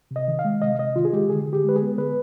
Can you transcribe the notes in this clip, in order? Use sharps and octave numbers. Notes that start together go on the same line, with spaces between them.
C3
D#5
D#3
F5
G#3
C3 D#5
C3 D#5
D#3 F4
G#4
G#3 G4
D3 G#4
D3
G4
G#3 B4
G#4
B3
D3 B4